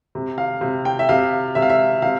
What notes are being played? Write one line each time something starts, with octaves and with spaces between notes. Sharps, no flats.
C3
F5
C3
G5
E5
C3 F5
C3 E5
F5
E5
C3 F5